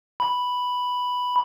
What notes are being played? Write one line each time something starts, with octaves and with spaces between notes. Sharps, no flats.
B5